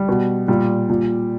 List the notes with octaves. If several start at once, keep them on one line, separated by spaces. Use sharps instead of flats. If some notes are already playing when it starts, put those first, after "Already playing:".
Already playing: G3
B2
A#2 G3
A#2